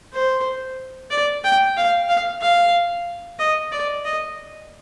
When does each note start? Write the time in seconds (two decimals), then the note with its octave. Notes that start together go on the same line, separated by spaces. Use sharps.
0.13 C5
1.11 D5
1.44 G5
1.77 F5
2.08 F5
2.41 F5
3.39 D#5
3.72 D5
4.05 D#5